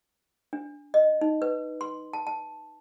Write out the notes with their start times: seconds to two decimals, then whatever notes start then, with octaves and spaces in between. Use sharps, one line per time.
0.53 D4
0.94 D#5
1.21 D#4
1.42 B4
1.81 C6
2.13 A5
2.27 A5